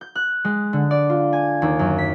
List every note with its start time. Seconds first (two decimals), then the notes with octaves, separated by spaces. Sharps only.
0.01 G6
0.15 F#6
0.45 G#3
0.73 D3
0.91 D5
1.10 F4
1.33 G#5
1.62 D#2
1.79 F#2
1.98 B6